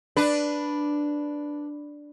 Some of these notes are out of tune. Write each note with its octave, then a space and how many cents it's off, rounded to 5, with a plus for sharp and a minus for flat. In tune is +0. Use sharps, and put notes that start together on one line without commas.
D4 +0 B4 +0